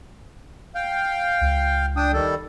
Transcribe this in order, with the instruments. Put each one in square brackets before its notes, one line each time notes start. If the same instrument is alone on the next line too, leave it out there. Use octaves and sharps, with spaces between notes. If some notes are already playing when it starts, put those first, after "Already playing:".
[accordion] F5 G5
[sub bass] C#2
[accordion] D4 G5 D#6
D#3 G3 A4